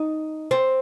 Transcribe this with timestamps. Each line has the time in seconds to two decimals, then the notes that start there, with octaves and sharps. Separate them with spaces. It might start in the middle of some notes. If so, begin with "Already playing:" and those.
Already playing: D#4
0.51 C4